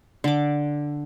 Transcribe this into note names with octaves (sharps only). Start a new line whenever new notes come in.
D3 D6